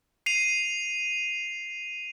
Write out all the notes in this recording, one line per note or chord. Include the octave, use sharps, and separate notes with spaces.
C7 D#7 F7